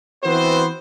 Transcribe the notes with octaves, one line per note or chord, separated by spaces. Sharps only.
E3 B3 C4 F#4 B4 C5